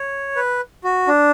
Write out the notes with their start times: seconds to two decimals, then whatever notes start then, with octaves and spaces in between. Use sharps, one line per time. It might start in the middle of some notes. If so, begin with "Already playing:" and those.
Already playing: C#5
0.36 B4
0.84 F#4
1.08 D4